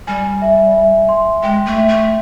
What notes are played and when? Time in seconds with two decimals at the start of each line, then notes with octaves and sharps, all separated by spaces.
0.07 G3 G#5
0.42 E5
0.76 E5
1.09 C6
1.43 G#3 G5
1.66 A3
1.77 E5
1.88 A3